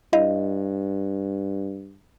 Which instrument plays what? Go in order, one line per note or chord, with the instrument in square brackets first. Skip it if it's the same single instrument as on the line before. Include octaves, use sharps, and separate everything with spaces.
[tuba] G2 [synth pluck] E4 D#5 F5